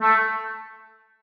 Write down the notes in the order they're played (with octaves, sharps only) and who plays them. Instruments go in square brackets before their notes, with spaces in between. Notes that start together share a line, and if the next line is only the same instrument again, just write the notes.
[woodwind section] A3